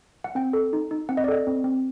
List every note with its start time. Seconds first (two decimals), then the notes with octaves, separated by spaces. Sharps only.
0.24 F#5
0.35 C4 G5
0.53 A4
0.73 D#4
0.91 D#4
1.09 C4 F#5
1.17 D#5
1.24 D5
1.28 A4 D#5
1.47 C4
1.64 C4